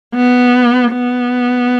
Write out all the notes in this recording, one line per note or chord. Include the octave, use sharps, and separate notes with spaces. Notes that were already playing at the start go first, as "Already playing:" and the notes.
B3
B3